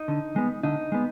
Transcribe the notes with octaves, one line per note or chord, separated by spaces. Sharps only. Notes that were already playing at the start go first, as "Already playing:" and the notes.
Already playing: D#4
D3
G#3 B3
D3 D#4
G#3 B3